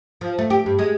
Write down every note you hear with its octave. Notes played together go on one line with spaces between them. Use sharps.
F3
A3
G4
G2
G#3